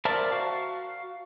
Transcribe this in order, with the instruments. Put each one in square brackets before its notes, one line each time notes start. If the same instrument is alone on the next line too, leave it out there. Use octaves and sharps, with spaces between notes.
[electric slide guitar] A#4 C5 D5 E5 A5 A#5
F#4 F5